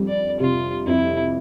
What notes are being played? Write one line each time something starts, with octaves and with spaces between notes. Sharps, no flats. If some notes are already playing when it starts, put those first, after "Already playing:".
Already playing: F2 G3
D5
C3 F4
F2 E4